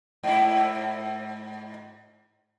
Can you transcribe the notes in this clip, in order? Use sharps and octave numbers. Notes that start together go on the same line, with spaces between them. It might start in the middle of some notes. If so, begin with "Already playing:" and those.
G#2 E4